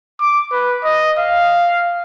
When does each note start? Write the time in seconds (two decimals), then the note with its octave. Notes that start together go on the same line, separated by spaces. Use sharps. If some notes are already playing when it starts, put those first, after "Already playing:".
0.20 D6
0.52 B4
0.84 D#5
1.19 F5